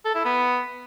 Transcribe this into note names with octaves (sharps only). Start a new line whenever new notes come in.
A4
E4
B3